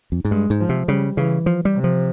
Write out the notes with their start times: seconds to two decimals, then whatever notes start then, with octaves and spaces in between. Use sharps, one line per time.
0.12 F2
0.25 G#2
0.31 G2 G#3
0.50 G#2
0.60 F3
0.69 C3
0.88 C#3 G3
1.17 C#3 E3
1.46 F3
1.65 G3
1.75 C3
1.84 F3